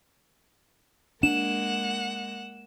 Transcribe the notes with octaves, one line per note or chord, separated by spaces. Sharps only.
G#3 A#3 D4 F#5 E7